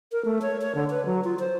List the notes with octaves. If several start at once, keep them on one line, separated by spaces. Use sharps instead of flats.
A#4
A3
C#5
C#5
D3
B4
F#3
F4
C5